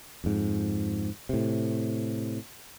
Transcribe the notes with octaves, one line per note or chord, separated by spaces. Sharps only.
F2 G#2
A2 C3